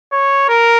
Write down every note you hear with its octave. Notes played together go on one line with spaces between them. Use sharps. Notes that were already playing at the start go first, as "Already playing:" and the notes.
C#5
A#4